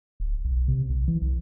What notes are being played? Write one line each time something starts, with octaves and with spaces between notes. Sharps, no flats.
D1
B1
C3
B1
E3
B1